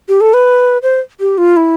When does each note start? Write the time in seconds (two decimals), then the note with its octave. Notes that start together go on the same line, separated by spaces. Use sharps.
0.08 G4
0.21 A4
0.33 B4
0.83 C5
1.20 G4
1.38 F4
1.56 E4